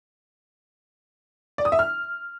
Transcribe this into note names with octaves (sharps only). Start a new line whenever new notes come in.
D5
D#6
E5
F6